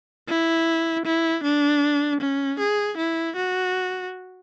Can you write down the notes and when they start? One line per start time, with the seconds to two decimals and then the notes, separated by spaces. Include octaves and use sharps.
0.28 E4
1.05 E4
1.44 D4
2.20 C#4
2.59 G#4
2.97 E4
3.36 F#4